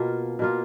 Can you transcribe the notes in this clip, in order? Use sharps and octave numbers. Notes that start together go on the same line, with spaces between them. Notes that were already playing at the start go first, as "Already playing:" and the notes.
Already playing: B2 A#3 F4
B2 A#3 F4